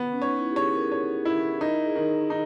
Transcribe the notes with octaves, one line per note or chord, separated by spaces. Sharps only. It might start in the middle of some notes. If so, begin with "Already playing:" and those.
Already playing: B3
C#4
D#4 C#5
E4
G4
G#4 C#5
A#4
C#5
E4
D#4 A#4
G#4
D#3 A#4
D#4